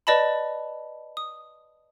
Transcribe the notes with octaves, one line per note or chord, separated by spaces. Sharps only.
B4 D5 D#5 A5 B5
D#6